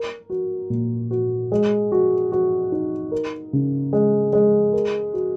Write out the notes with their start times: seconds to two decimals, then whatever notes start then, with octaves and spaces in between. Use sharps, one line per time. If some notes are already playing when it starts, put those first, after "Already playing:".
Already playing: A#4
0.30 F#4
0.70 A#2
1.11 F#4
1.52 G#3
1.92 F#4
2.32 F#4
2.72 D#4
3.12 A#4
3.53 C#3
3.93 G#3
4.33 G#3
4.73 A#4
5.14 F#4